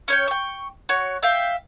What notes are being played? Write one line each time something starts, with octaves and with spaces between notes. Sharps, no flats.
C#4 C#5 G5
G5 C#6
F#4 C#5
E5 F5 G5